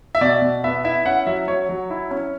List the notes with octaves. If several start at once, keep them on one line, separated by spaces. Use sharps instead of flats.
E5
B2 D5
B2
B3 E5
E4 E5
C#4 F#5
F#3 E5
F#3 C#5
F#3
E4
C#4